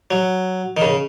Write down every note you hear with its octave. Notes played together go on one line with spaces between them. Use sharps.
F#3
D#3
C#3